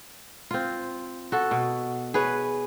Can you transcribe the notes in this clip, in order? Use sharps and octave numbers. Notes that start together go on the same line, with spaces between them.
C4 F4
F#4 A4
B2
G#4 B4 C#5